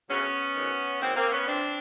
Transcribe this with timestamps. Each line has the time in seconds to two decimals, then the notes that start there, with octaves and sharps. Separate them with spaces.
0.09 D2 C#3 F#3 B3 C#4
0.55 G#2 D#3 F#3
1.01 G#2 D#3 F#3 A#3 C4
1.16 A#3 C4
1.32 B3 C#4
1.47 F2 C3 F3 C4 D4